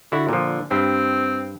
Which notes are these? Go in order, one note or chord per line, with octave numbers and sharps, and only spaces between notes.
D3 E4 F#4
A#2 D3 F3
G2 C4